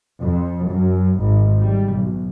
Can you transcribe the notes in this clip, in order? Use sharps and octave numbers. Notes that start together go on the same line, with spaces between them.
F2
F#2
G#1
G3
B1